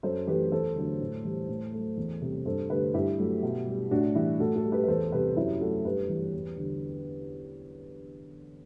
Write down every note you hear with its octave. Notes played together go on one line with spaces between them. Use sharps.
F#2 A4 C5
E3 A3 G4 B4
E2 A4 C5
D3 F#3 A3
A2
E3 G3
A2
F#3 A3
E2
C3 G3
G2 A4 C5
D3 A3 G4 B4
G2 E4 G4
F#3 A3
B2
G3
A2 D4 F#4
E3 G3 E4 G4
A2 F#4 A4
F#4 A4
G3
G4 B4
B4
E2 A4 C5
C3 G3 G4 B4
F#2 E4 G4
F#3 A3 F#4 A4
G2 G4 B4
E3 G3
E2
D3 G3